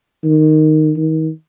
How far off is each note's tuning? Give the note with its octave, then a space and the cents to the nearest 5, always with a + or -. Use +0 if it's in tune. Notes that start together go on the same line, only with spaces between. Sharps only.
D#3 -5
D#3 +30